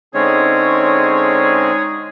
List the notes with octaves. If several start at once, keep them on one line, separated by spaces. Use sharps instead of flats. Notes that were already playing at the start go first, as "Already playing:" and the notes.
D3 G#3 C4 C#4 D#4 G#4 C#5